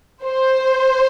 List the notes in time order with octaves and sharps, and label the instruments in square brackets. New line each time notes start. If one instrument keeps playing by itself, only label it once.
[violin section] C5